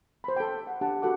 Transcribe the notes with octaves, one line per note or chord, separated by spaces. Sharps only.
C5 B5
A4 G5
F#5
D4 G4 F#5 A5
F#4 A4 F#5 D6